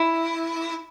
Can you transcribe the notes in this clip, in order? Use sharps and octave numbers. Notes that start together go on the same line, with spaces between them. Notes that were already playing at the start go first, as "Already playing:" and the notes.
Already playing: E4